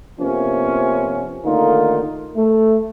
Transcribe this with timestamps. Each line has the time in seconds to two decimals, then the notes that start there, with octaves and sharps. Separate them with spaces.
0.20 C3 F3 A#3 B3 C#4
1.45 D3 D#3 A3 A#3 D#4 F4
2.37 A3